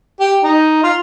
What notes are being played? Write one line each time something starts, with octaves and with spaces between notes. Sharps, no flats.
G4
D#4
F4